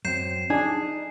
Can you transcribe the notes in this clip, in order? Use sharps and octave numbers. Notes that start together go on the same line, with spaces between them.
F#2 C4 G6 C7 E7
D4 D#4 G#4